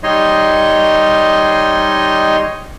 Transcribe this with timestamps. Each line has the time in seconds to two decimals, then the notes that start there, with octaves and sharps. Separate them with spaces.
0.03 G3 D#4 C#5 D#5 C6